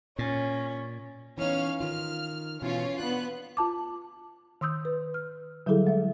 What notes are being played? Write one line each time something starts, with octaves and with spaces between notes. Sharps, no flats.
A#2 C#4
E3 B3 C#4 D#4 F5 F6
D#3 F4 F6
B2 E3 C#4 F4 C#5
B3 D4 F#6
F4 A5 D6
D#3 C6 D#6 E6 G6
B4
F6
D3 F#3 G3 E4 G#4 A4
G#3 E5